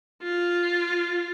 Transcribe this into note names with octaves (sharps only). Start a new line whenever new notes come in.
F4